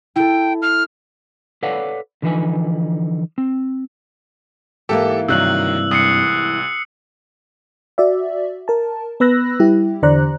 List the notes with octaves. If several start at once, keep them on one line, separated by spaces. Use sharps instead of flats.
E4 A4 G5
F6
A4 B4 C#5 D5 F5 F#5
D3 E3 F3 D#4 B4 G#5
C4
G#2 E3 A#3 G4 A4
G2 C3 D#3 F#3 E6 F#6 F#7
C2 D#6 C7 C#7
F#4 D5 E5
A#4 A5
B3 B4 B5 E6 F#6 A#6
G3 E4 G4
E2 D3 C5 D5 A#5 F#6